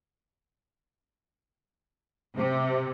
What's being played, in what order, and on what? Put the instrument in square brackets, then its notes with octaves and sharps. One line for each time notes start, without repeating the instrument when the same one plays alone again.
[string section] C3